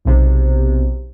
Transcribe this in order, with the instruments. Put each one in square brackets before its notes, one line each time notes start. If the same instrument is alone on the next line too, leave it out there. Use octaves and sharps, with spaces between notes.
[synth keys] B1 C3